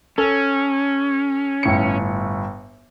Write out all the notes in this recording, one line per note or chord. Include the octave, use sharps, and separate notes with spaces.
C#4 A4
G1 A2 C#7